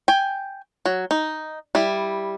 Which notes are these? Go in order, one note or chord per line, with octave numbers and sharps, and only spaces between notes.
G5 G#5
F#3
D#4
G3 E4